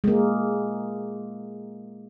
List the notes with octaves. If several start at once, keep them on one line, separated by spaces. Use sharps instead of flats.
G#3 A#3